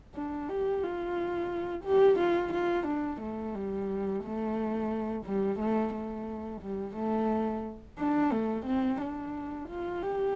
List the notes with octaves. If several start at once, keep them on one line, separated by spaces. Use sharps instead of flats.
D4
G4
F4
G4
F4
F4
D4
A3
G3
A3
G3
A3
A3
G3
A3
D4
A3
C4
D4
F4
G4